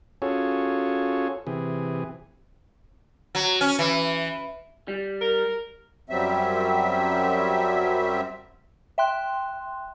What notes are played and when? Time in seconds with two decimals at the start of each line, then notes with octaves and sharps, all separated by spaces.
0.22 C#4 F4 F#4 G#4 A4 C#5
1.47 C3 E3 G#4
3.35 F#3
3.61 C#4
3.79 E3
4.88 G3
5.21 A#4
6.10 F#2 F#3 G3 C4 E5
8.98 E5 G5 C6 F#6